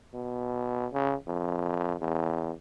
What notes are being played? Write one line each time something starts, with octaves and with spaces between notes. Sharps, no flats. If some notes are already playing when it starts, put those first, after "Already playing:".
B2
C#3
F2
E2